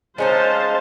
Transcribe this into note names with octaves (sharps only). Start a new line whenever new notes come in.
G#3 C#4 D#4 C5 F5 A5